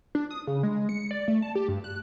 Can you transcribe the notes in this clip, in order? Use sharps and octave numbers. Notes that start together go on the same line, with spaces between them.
D4
D#6
C#3
G#3
C#7
D5
A3
A5
G4
G2
F#6